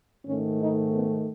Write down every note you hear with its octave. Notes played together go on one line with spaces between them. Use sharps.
G#2 D#3 A3 C#4
D#4
B3